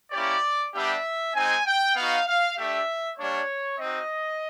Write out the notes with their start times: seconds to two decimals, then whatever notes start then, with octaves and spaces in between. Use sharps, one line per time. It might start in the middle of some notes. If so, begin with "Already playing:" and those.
0.12 A#3 C#4 E4 G4 D5
0.74 G3 B3 D4 G4 E5
1.35 G#3 C4 D#4 G#5
1.66 G5
1.96 B3 D#4 F#4 F5
2.27 F5
2.58 A3 D4 G4 E5
3.18 G3 A#3 D4 C#5
3.79 C4 D#4 F#4 D#5